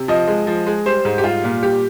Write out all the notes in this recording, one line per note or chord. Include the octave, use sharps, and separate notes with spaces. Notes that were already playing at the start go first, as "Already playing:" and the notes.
Already playing: C3
F3 D#5
G#3
F3
G#3
G3 C5
G#2
G4
G3 F4
A#2
G3 G4